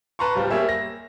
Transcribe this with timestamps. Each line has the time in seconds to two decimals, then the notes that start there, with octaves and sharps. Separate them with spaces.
0.19 B4 A5 A#5 C6 C#6
0.35 D1 G3 F4 C5
0.51 G3 A#3 G#4 C#5 E5
0.69 A#6